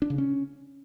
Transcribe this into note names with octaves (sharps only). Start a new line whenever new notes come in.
D4
C#3
C#4